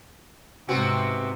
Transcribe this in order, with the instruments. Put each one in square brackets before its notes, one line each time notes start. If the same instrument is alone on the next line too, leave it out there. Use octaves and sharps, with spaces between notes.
[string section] G#2 C3 [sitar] B3 C4 F#4